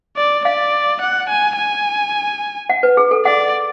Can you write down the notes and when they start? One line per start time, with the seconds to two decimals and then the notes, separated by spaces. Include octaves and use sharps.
0.17 D5
0.45 D5 F5
1.01 F#5
1.29 G#5
1.57 G#5
2.70 F#5
2.83 B4
2.97 G#4
3.11 A4
3.25 D5 F#5